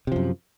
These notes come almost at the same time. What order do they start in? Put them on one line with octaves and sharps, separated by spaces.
C3 F3 F#2